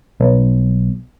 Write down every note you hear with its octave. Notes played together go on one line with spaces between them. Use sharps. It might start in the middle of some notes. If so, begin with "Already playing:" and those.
B1